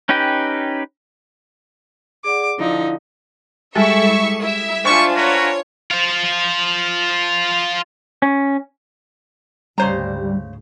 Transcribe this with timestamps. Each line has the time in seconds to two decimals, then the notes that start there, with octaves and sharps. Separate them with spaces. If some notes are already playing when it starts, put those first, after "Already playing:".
0.09 C#4 D#4 G4 B4 G5
2.24 G#4 D5 F#5 D6
2.59 D3 F3 D#4 E4 F5
3.75 G3 G#3 E4 A4 E5 C#6
4.40 E4 E5
4.85 G3 D4 F4 C5 G#5 C#6
5.15 F#4 A#4 B4 C#5
5.91 F4 C5
8.22 C#4
9.78 D2 G#2 C#3 G3 C5 A#5